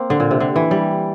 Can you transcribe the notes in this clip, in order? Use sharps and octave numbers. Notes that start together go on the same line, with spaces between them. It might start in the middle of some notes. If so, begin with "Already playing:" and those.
Already playing: A#3 C4
D3
A#2
C3
D3
E3
G3